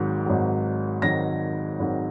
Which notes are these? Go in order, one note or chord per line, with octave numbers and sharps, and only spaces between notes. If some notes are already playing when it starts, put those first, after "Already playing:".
Already playing: G#1 G#2 D#3 F#3
G#1 G#2 D#3 F#3
G#1 G#2 D#3 F#3 A#6
G#1 G#2 D#3 F#3